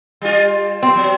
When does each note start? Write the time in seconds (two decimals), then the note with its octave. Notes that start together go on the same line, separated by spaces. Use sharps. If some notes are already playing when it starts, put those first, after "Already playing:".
0.22 G3 F4
0.83 C4
0.96 F#3